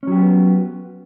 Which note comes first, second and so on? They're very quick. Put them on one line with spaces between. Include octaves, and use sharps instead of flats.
C#4 F#3 G4 B3